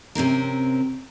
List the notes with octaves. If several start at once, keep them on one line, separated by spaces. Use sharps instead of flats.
C3 C4 C#4 A#4